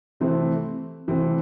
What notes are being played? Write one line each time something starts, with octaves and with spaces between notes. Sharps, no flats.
C3 E3 A3 C4
C3 E3 A3 C4